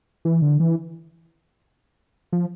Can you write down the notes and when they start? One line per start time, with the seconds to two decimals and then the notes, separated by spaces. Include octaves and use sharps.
0.25 E3
0.42 D3
0.60 E3
2.32 F3